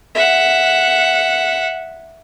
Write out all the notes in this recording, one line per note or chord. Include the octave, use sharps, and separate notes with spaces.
E5 F#5